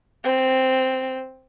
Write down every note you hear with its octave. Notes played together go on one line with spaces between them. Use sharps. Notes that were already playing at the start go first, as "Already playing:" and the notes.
C4